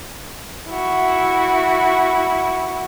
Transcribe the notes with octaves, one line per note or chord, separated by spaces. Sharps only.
E4 F#4